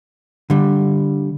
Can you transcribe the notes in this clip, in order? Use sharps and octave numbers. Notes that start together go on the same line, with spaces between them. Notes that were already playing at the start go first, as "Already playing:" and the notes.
D3 G3